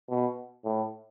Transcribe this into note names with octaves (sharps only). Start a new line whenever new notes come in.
B2
A2